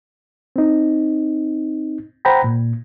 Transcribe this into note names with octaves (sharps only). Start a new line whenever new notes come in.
C4 D#4
C5 F#5 G5 A#5 B5
A#2